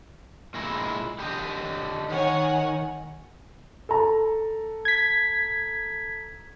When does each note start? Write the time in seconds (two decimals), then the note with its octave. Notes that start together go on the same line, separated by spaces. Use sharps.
0.54 A#2 G#3 E4
1.19 D3 G4 D#5
2.10 D#3 C#5 F#5 G#5
3.89 A4 A#5
4.85 G#6 B6